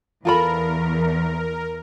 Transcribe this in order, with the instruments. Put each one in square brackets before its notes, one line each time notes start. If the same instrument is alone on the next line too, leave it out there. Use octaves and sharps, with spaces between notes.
[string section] E2 [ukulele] F4 A4 B5 [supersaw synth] A#4